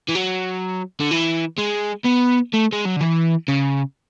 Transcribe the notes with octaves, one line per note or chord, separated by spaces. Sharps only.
E3
F#3
D3
E3
G#3
B3
A3
G#3
F#3
D3
E3
C#3